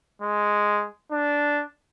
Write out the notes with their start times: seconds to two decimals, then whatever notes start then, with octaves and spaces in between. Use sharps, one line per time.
0.22 G#3
1.12 D4